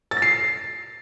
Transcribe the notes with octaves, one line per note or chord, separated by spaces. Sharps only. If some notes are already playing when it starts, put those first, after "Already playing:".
A6
A#6
C7